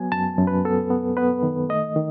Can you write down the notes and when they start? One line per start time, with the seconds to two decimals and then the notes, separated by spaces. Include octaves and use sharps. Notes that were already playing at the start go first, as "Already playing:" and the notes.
Already playing: F#3 B3 G#5
0.12 F#2 A5
0.38 F#2
0.47 B4
0.65 B3 A4
0.90 B3
1.17 B3 B4
1.43 D#3
1.69 A3 D#5
1.96 D#3